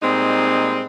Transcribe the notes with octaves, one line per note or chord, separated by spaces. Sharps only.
A#2 G3 G#3 C4 D#4